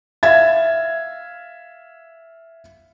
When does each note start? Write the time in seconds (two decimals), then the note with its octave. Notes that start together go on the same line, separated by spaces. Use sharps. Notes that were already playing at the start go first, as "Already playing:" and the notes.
0.23 E5 F5 G#6 A6